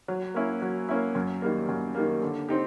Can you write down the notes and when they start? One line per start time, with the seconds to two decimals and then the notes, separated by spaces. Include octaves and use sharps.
0.08 F#3
0.34 A#3 C#4 E4
0.62 F#3
0.89 A#3 C#4 E4
1.15 F#2
1.42 D#3 G3 A#3
1.69 F#2
1.95 D#3 G3 A#3
2.22 D3
2.49 C4 D#4 G4